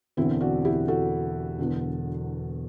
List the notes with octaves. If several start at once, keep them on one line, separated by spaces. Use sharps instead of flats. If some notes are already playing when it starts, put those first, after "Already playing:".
E1 E2 D3 C4 E4
D4 F#4
E4 G4
F#4 A4
E1 E2 D3